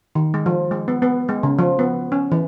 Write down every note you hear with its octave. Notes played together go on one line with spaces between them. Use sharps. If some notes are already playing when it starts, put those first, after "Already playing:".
D#3
G#3
F3
G#3
B3
B3
G#3
C#3
F3
B3
C#4
E3